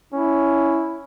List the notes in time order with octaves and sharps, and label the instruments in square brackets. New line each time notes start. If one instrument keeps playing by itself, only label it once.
[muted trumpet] C#4 [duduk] E4